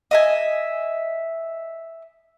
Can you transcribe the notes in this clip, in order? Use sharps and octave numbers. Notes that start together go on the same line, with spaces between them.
D#5 E5 G#5